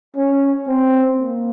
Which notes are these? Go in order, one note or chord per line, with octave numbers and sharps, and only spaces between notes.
C#4
C4
A#3